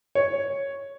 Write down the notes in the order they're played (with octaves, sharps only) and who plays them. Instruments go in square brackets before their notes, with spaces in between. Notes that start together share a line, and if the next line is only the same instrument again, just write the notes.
[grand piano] C#5